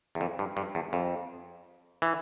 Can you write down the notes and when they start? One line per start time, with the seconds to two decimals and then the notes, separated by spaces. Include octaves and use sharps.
0.15 E2
0.21 F2
0.39 G2
0.57 G2
0.75 E2
0.93 F2
2.02 E3